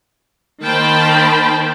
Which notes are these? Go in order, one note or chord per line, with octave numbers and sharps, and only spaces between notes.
D#3 A#3 C5 G5 A5 B5